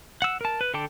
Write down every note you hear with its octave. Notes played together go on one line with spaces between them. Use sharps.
F#5 E6
A#4 A5
B4
D3 A4 G5 A5 D6